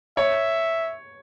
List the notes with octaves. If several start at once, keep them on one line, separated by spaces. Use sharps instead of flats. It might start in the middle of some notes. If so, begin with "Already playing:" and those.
C#5 E5